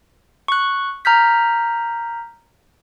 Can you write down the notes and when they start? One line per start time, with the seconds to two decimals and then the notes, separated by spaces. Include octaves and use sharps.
0.48 C#6 F#6
1.05 A#5 F6 G6 B6